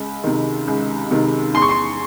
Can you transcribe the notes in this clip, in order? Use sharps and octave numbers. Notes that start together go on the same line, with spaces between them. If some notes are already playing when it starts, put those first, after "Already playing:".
Already playing: C#2
C3 D#3
C#2
C3 D#3
E2 C6
C#6
C6